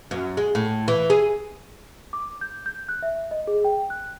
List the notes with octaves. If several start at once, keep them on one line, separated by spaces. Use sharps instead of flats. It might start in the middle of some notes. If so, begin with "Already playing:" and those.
F#2
G#3
A2
E3
G#4
D6
G6
G6
F#6
E5
D#5
G#4
G5
F#6